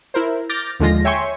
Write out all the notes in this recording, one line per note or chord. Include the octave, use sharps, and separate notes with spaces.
E4 A#4 C5
D6 F6 G6 A6 A#6
D#2 D3 F3 G#3 F4 A#6
C#5 E5 G5 G#5 C6 C#6